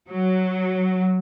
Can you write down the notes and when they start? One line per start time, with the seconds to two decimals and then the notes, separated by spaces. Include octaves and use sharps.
0.10 F#3